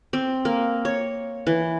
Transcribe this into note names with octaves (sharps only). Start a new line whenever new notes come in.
C4
A#3
C#5
E3